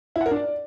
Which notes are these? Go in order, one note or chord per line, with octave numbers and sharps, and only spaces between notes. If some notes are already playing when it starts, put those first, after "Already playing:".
E4
F#5
A#4
D4
D5